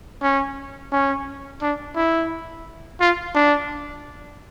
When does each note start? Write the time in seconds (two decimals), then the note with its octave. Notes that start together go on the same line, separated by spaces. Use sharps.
0.22 C#4
0.92 C#4
1.62 D4
1.96 E4
3.00 F4
3.35 D4